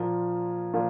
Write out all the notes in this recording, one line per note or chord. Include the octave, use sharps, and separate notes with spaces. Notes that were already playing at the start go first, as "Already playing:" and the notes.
Already playing: A#2 F3 A#3 F4
A#2 F3 A#3 F4